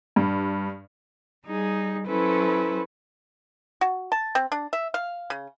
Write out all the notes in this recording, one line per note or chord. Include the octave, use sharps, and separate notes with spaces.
G2
G3 D#4 G#4
F#3 C#4 E4 A4 B4 C5
F#4
A5
C4
D4
E5
F5
C#3